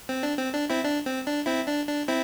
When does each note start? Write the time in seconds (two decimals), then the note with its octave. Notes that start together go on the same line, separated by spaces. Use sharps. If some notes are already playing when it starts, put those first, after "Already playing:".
0.09 C4
0.23 D4
0.38 C4
0.54 D4
0.70 C4 E4
0.84 D4
1.05 C4
1.26 D4
1.46 C4 E4
1.67 D4
1.88 D4
2.08 C4 E4